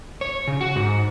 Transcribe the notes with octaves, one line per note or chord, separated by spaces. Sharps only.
C#5
C#3
F#4
G#2